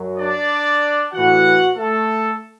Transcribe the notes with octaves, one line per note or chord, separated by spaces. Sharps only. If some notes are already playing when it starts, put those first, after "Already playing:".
Already playing: F#2 F#3
D4 D5
A2 E3 F#4 F#5
A3 A4